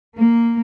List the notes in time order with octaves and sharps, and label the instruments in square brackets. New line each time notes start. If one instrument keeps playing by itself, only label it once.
[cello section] A#3